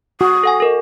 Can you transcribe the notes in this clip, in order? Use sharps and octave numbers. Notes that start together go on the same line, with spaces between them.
F#4 D#6
A4 F#5 G#5
A4 A#4 D#5